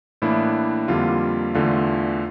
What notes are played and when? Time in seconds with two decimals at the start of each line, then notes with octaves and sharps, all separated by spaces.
0.22 A2 E3 A#3 D4 E4
0.88 F2 D3 G3 A#3 F4
1.55 E2 D3 A3 F4